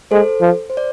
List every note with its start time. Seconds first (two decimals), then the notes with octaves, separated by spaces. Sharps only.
0.11 G#3 A4 C5
0.41 F3
0.70 C5
0.77 D5